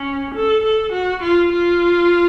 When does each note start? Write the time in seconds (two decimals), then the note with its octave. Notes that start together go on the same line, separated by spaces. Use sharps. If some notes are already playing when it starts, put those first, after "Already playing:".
Already playing: C#4
0.35 A4
0.64 A4
0.93 F#4
1.23 F4
1.52 F4